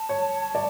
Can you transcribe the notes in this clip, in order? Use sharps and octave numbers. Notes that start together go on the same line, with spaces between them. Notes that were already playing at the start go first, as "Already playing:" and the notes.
Already playing: A5
C#5
D5